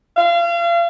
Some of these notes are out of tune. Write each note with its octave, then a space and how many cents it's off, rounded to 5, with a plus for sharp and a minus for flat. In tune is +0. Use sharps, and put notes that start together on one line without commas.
F5 -35